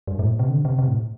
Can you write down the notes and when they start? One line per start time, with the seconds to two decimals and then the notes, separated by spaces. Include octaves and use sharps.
0.07 G2
0.19 A2
0.29 A#2
0.39 C3
0.50 D3
0.65 C3
0.79 C3
0.88 A2